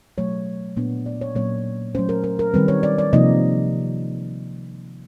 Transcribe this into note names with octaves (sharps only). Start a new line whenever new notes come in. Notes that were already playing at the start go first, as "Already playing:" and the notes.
B2 F#3 A3 C#5
A#2 F#3 B3 D4
D5
C#5
A#2 F#3 A#3 C#4 C#5
F#3 A3 C#4 C5
A#4
A#4
A#4
D#3 G3 C4 B4
C#5
D5
D5
C3 F3 A#3 D#4 D#5